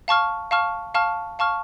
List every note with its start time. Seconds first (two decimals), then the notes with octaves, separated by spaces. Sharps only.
0.08 F5 A5 C#6 F6
0.51 F5 A5 C#6 F6
0.94 F5 A5 C#6 F6
1.39 F5 A5 C#6 F6